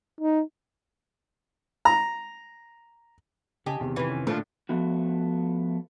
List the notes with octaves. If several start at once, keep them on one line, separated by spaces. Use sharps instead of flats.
D#4
A#5
C#3 G4 D#5 G#5 A5
E2 C3 D#3
F2 E3
C#4
A2 D3 F3 A#3 D4
F3 A3 B3 F#4